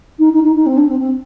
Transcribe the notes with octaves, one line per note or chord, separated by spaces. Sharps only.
D#4
D#4
D#4
D#4
C4
D4
C4
C4